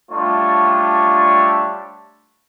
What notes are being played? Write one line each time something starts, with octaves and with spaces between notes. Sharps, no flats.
G3 A3 D4 F4 C#5